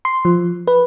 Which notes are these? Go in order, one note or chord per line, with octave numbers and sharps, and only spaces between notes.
C6
F3
B4